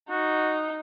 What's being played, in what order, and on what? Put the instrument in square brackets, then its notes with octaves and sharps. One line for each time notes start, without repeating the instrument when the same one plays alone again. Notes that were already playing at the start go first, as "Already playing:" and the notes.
[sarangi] D#4 [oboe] F#4